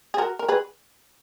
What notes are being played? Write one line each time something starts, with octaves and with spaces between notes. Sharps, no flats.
G#4
F#4 A#4
A#4
G#4 B4